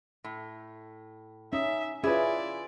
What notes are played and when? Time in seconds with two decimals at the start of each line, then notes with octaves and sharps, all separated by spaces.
0.24 A2
1.53 C#4 D#4 E5
2.04 C#4 E4 F4 G#4 B4 D5